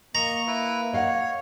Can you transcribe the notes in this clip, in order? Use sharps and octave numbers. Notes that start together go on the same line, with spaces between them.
A#3 D#5 A#5 C#6
E4 B4
C#5 D#5 F5 F#5